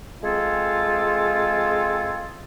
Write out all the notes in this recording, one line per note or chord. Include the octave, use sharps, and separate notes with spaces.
G#3 C4 F4 G#4 A4